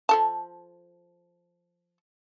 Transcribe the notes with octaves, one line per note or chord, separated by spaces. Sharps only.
F3 A4 A5